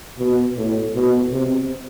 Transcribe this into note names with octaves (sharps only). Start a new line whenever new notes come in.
B2
A2
B2
C3